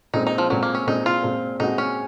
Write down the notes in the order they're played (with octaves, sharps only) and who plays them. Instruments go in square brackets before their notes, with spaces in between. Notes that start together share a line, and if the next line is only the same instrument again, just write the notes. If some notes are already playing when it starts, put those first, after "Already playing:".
[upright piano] A#2 G#3 C4 [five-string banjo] D#4
[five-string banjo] D#4
F3
[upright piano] A#2 G#3 C4 [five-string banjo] F#3
[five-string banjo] A#3
C#4
[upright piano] A#2 G#3 C4 [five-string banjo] D#4
[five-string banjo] F4
[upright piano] A#2 G#3 C4
[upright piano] A#2 G#3 C4 F#4 [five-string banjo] D#4
[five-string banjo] C#4